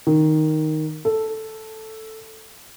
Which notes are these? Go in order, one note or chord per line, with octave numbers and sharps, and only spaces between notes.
D#3
A4